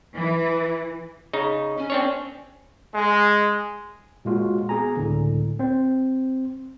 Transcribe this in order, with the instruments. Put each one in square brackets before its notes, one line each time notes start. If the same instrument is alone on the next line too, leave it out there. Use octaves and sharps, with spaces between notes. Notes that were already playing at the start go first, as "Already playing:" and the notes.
[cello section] E3
[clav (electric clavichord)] C#3 D#4
[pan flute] C#4
[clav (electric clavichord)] C4 D4 C#5
[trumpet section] G#3
[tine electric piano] A#2 G#3 F4 F#4
B3 G#4 G#5 A#5
C#2 A2 D3
C4 C5